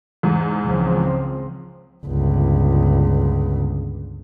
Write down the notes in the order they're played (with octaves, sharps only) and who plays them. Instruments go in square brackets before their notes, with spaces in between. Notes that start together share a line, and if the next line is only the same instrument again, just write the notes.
[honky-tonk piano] E2 G#2
[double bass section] C#2 F3 C4
[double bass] G1 C#2